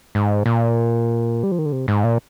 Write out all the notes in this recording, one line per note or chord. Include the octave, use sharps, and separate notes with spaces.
G#2
A#2
G3
F3
D#3
D3
C3
G#2
A#2